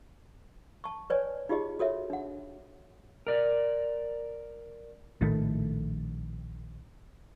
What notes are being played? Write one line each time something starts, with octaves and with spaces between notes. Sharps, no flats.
A5 C#6
B4 C#5 D5 G#5
D#4 F4 G4 G#4 D#5
F#4 A4 C#5 E5
D4 F#5
A#4 D5
A#1 A2 D#3 A3